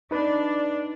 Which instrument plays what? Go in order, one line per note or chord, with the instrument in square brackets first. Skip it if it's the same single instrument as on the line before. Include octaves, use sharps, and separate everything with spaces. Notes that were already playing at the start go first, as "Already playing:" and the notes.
[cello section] D4 [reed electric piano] D#4 B4